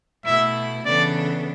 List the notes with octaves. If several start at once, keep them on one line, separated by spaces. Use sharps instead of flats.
B2 A3 E4 E5
C#3 E3 B3 D4 A4 D5